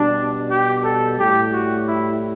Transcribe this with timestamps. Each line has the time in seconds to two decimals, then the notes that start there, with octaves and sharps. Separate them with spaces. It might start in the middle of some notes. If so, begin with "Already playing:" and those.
Already playing: B2 G3 D4
0.49 G4
0.83 A4
1.18 A2 G3 G4
1.52 F#4
1.87 E4